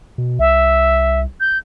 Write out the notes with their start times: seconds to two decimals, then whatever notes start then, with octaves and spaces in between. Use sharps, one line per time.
0.18 B2
0.39 C2 E5
1.40 G6